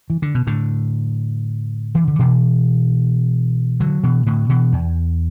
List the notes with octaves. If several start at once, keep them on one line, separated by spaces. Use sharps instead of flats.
E3
D3
B2
A2 D3
E3
D3
B2 E3
D3 F#3
B2 E3
A2 D3
B2 E3
E2